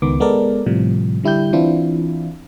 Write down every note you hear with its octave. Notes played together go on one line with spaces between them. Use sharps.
C#2 D#3 B3 D6
G#3 B3 A4 A#4 D5
A2 C3 F3 G3
D3 G3 E4 G4 G6
E3 C4 D4 E4 F4